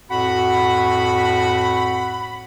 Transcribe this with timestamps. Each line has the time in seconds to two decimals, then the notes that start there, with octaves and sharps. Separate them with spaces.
0.09 F2 A2 F#4 F#5 B5